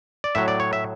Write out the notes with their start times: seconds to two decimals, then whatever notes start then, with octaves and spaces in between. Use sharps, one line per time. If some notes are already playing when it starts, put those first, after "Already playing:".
0.24 D5
0.35 A2 F#3 E5
0.48 D5
0.60 C#5
0.73 E5